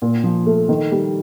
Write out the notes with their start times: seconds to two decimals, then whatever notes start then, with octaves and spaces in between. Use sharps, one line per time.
0.02 A#2
0.24 F3
0.46 A3
0.69 D#3
0.92 G3